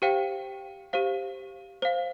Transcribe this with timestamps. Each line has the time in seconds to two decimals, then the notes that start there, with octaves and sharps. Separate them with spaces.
0.02 G4 C5 F5 G5
0.93 G4 C5 F5
1.82 C5 F5